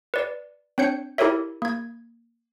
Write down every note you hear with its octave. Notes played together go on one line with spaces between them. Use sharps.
B4 D5
C4 D4 C#5 G6 C#7
E4 G4 A4 A#4 C#5 E5
A#3 G#6